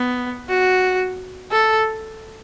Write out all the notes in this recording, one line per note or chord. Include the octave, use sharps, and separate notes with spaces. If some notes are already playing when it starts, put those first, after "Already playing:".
Already playing: B3
F#4
A4